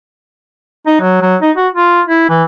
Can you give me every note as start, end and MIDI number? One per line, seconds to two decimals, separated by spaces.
0.87 0.96 63
1.01 1.17 54
1.22 1.36 54
1.42 1.51 63
1.57 1.68 66
1.74 2.02 65
2.07 2.28 64
2.29 2.44 52